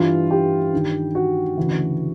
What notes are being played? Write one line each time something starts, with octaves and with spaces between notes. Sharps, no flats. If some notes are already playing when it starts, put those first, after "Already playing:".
Already playing: G2 E3 F4
G4
G2 D#3
F#4
D2 C#3 E3